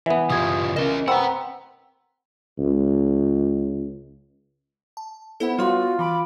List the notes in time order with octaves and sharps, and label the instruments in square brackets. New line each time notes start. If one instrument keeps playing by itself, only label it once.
[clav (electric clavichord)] E3 B3 [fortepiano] E5
[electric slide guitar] C#3 F4 G4 [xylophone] D#6 G#6
[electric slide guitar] C#4 D#5 [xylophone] A#4 E7 G7
[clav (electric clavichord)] C4 [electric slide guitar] B4 F#5 [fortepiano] A#5 E6 [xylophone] B5
[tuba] C#2
[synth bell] A5
[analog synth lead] B3 [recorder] E4 [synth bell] A4 C5 F#5
[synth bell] G3 C#5 [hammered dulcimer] F4 [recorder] F#4
[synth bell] E3 [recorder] B5 [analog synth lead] D6